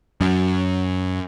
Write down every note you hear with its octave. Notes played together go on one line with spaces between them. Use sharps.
F#2